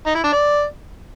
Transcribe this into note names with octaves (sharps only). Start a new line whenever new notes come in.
D#4
E4
D4
D5